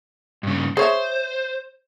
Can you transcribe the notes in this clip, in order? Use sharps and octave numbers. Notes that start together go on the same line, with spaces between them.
G2 C#3
G#4 C5 C#5 E5